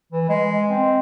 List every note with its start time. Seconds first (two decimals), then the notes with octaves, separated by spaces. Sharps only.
0.12 E3
0.29 G#3
0.70 C4